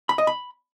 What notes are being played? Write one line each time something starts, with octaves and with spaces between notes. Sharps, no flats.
B5
D#5
B5